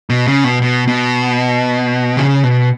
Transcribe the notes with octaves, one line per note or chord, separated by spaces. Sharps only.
B2
C#3
B2
B2
B2
C#3
B2